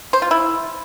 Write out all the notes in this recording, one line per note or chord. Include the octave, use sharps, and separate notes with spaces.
C5
F4
E4